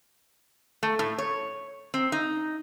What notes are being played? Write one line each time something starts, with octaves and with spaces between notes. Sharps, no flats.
A3
A2
C#5
C4
D#4